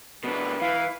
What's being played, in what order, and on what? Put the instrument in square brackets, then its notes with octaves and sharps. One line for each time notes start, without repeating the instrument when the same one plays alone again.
[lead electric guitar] B2 D4 [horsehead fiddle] B4
[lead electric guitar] E3 [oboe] F5